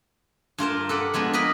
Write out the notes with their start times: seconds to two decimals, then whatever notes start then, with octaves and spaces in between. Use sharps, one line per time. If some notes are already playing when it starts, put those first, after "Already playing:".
0.58 G2 F4 A#4 A5
0.89 A4 B4 D5 F#5
1.14 F3 G#3 B3 D4
1.33 A#4 B4 D#5 B5